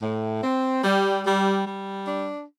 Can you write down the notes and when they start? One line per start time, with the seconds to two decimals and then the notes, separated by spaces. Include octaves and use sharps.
0.02 A2
0.43 C4
0.84 G3
1.26 G3
1.67 G3
2.07 D4